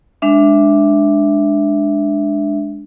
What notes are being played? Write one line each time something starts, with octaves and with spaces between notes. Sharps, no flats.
G#3 D4 E5